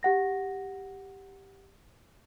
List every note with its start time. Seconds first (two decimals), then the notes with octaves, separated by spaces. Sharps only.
0.03 G4 F#5 A#6